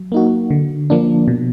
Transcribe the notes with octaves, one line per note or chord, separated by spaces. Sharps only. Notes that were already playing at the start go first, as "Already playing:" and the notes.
Already playing: F#3
A#3 D#4 F#4
D3
F3 A#3 D4
B2